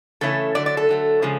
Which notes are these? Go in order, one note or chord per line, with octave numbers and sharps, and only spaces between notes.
C#3 E3 A3 C#4 E4 A4
D3 F#3 A3 D5
D5
A4
D3 F#3 A3
C#3 F3 G#3